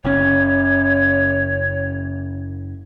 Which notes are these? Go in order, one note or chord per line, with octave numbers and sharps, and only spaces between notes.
F#1 C#3 C#4 C#5